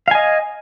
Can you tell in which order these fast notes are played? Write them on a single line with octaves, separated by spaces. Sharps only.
F5 G#5 D#5